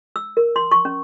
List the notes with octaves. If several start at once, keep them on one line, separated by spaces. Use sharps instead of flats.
E6
A#4
C6
C#6
C#4